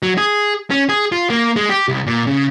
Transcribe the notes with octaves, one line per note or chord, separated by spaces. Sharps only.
F#3
G#4
C#4
G#4
F4
A#3
G#3
G4
C2
A#2
C#3